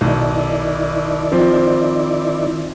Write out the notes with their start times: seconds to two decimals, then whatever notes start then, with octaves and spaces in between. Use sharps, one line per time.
0.01 B1 D#3 E4 D5
1.32 F3 C4